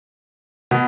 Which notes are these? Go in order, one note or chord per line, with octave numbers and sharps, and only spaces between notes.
B2 B3